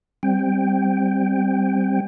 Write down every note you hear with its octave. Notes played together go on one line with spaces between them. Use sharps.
G3 C4 G5